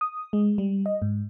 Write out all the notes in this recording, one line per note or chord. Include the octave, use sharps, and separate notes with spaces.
D#6
G#3
G3
D#5
G#2